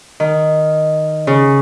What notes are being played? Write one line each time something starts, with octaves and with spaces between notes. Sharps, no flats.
D#3
C#3